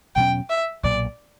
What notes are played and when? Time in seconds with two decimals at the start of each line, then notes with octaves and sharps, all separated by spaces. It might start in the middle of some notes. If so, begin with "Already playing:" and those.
0.15 E2 B2 F#3 C#4 G5
0.50 E5
0.83 B1 A#2 F#3 A#3 D5